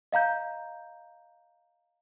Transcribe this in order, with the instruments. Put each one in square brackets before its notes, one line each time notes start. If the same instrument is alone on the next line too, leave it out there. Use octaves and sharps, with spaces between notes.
[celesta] D#5 F5 A#5 G6